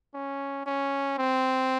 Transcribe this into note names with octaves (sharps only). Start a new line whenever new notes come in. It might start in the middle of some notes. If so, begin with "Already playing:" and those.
C#4
C#4
C4